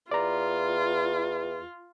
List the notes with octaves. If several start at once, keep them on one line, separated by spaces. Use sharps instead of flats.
E2 F4 D5 A#5